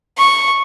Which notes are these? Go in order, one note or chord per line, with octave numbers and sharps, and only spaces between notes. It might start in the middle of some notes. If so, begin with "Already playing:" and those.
C#6